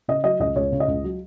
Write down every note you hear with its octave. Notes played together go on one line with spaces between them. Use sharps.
C#3 D#5
F#3 D#5
C#2 D#5
C#2 C#5
C#3
D#5
C#2
F#3